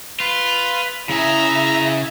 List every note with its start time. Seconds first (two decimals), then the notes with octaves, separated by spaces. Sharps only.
0.20 F4 B4
1.10 C#3 E4 G#4 E5 A#5